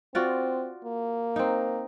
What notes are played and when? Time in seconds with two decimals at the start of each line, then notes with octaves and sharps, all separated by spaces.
0.15 C4 F4 F#4 D5
0.85 A#3
1.36 C4 D#4